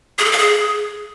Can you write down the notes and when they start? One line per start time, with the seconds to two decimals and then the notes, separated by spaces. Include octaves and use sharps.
0.18 G#4
0.25 A4
0.32 F5
0.38 G#4